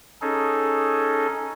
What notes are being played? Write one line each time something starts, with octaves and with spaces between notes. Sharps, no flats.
C#4 D#4 G#4 A4